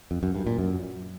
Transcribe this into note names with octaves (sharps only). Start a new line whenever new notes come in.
F2
F#2
G2
A#2
F#2